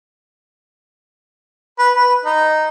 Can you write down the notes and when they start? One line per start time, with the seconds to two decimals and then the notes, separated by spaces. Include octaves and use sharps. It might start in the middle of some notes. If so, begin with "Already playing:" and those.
1.79 B4
1.96 B4
2.25 D#4